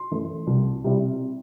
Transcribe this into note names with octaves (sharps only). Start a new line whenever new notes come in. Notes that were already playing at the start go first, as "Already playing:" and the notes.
Already playing: C6
F#2 E3 A3
C2
C3 G3 C4 E4